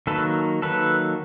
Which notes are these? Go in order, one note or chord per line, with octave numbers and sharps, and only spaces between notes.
D#3 F#3 A#3 A4 B4
D#3 F#3 A#3 A4 B4